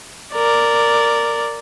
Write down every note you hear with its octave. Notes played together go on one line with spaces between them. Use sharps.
A#4 D5